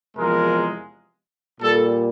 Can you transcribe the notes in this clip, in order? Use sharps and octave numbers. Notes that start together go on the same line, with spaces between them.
E2 C3 F3 G#3 A#4
A#2 G3 A4